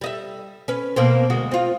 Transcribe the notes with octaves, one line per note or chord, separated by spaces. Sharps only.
G3 D#5 E5
C#4 B4
B2 A#3 C4
D2 G#3 F#4
C4 F4